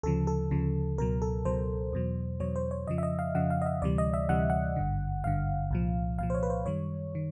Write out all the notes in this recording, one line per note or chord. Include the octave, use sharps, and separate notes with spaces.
D2 C#3 F3 A4
A4
D2 C#3 F3
C#2 B2 F#3 A#4
A4
C#2 B2 F#3 C5
E2 B2 F#3
E2 B2 F#3 C#5
C5
C#5
F2 C#3 F3 D#5
E5
D#5
F5
F2 C#3 F3 F#5
F5
D#5
E5
D2 C3 E3 G3 D5
D#5
E5
D2 C3 E3 G3 F#5
F#5
G#1 G2 D3
G#1 G2 D3 F5
C2 A#2 F3
C2 A#2 F3 F5
C5
C#5
B4
C5
F#2 D#3 G3 C#5
D#3